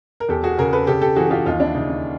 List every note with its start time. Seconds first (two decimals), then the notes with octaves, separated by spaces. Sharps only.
0.20 A#4
0.28 E2 G4 A4
0.43 F#4 G#4
0.58 C#3 G#4 A#4
0.73 A4 B4
0.87 C#3 G4 A4
1.02 G4 A4
1.16 E3 F#4 G#4
1.27 G#4
1.31 F4 G4
1.46 D#2 D#4 F4
1.60 D4 E4
1.75 C#3 D#4
1.90 D#4